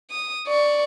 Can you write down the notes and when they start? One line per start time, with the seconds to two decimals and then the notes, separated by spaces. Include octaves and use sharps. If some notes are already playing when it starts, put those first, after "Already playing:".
0.11 D#6
0.48 D5 C#6